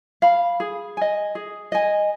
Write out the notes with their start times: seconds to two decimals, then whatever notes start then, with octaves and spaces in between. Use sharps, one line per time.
0.22 F5 B5
0.60 G#4
0.97 D#5 G#5
1.35 G#4
1.72 D#5 G#5